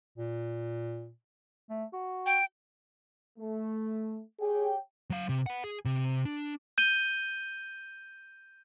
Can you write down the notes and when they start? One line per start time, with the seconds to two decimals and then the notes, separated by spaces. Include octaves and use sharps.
0.18 A#2
1.70 A3
1.93 F#4
2.26 G5
3.39 A3
4.40 G4 G#4 C#5 G5
5.10 F#3 F5
5.29 C3
5.46 B4 F#5
5.64 G#4
5.85 C3
6.25 D4
6.78 G6 D#7 G7